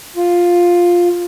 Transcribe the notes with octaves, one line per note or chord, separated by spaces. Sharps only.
F4